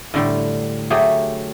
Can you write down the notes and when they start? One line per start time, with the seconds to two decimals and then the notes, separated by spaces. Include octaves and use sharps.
0.14 A2 D3 G3
0.90 F#3 A3 G4 G#4